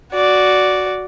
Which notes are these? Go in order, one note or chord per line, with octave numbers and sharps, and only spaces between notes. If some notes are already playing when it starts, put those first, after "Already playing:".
F#4 D5